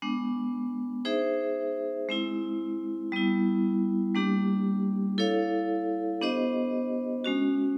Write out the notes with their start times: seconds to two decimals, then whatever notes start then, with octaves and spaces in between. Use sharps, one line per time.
0.02 G#3 B3 D4
1.05 D#4 G#4 C5 E5
2.09 G#3 C4 E4
3.12 G3 B3 E4
4.15 G3 A#3 D4 G4
5.18 E4 A4 C#5 F5
6.21 B3 D4 G4 C5 D#5
7.24 G#3 C#4 F#4